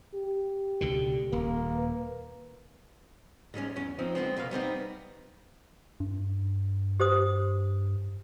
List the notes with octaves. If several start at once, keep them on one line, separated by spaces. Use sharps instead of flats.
G4
C#2 B2 D3
D#1 A#3
B4
G#2 G3 G#3 C#4
E2 C#4
F3 C4 D#4
D3 G#3 B3 C4
C2 B2 A#3 F5
G3 B3 C4 D#4
G2
G4 C5 D#6